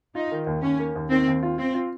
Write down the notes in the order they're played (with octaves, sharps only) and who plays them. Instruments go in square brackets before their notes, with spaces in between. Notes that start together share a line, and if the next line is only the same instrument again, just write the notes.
[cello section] D#4 [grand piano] F4
[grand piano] D#3
D#2
[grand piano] D#2 [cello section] C#4
[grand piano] A#3
D#2
[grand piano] D#3 [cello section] C4
[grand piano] D#2
F4
[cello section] C4 [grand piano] F4
[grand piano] F4